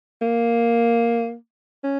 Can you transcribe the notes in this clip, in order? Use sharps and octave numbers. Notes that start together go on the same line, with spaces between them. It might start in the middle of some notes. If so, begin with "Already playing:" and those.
A#3
C#4